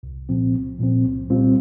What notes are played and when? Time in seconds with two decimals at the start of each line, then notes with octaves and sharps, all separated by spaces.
0.03 C2
0.29 A#2 F3 C4
0.53 C2
0.79 A#2 F3 C4
1.03 C2
1.29 A#2 G3 C4 F4